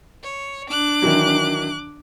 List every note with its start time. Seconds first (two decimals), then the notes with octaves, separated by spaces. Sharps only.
0.24 C#5
0.70 D4 D6 F#6
1.02 D#3 E3 F#3